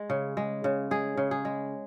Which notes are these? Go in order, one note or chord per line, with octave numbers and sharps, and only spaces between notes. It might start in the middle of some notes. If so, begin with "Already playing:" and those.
Already playing: G#3
C#3
G#3
C#3
G#3 G#4
C#3
G#4
G#3